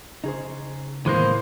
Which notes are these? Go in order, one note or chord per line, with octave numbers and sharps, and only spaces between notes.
C#3 D#4 G#4 C5
A2 D#3 E3 G#3 A#3 B3 C5